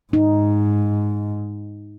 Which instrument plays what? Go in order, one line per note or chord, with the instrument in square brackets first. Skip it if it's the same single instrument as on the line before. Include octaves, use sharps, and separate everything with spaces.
[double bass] G#2 [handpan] D#4